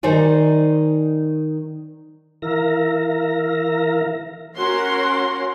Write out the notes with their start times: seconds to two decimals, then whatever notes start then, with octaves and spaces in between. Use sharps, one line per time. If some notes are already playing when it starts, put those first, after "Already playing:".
0.03 D#3 D#4 C5 D5 G#5
2.42 E3 A#4 E5 F5 A#6
4.56 C#4 F#4 A#4 F#5 C6